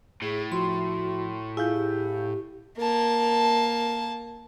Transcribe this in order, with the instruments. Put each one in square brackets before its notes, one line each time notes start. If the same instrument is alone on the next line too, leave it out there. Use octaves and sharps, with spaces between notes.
[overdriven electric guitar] A2 [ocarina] G#4
[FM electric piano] F3 [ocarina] F#4 [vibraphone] C6
[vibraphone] E4 [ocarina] F4 [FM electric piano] G#4 F5 G6
[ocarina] G4
[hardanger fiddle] A#3 A5